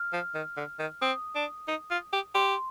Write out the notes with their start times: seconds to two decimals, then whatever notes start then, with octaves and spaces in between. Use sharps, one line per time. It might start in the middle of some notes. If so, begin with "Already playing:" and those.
Already playing: F6
0.13 F3
0.35 D#3
0.57 D3
0.79 D#3
1.01 C4 D#6
1.35 D4
1.68 D#4
1.91 F4
2.13 G4
2.35 G4 C6